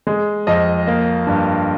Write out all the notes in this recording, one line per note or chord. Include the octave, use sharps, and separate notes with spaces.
G#3
F2 D#5
A#3
G2